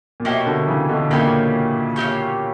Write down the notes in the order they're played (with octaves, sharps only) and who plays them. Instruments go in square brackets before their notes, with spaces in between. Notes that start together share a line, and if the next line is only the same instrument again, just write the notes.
[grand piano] A#2
[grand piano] B2 [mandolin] A#3 E4 G4 C#5
[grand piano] B2 D3
C#3 E3
B2 D3
[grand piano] A#2 C#3 [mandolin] A#3 E4 G4 C#5
[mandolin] A#3 E4 G4 C#5